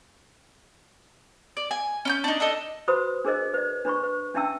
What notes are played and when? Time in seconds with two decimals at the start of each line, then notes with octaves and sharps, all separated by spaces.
1.57 D5
1.71 G#5
2.05 C#4 D6 G6
2.24 D4 D#4
2.40 D4 A4 D#5
2.88 F#4 B4 C5 B5 D#6
3.25 D4 G#4 A#4 C5 D#5
3.54 B4 D5
3.85 D4 B4 B5 C#6
4.03 B4
4.34 C#4 D4 E5 G5 A5 E6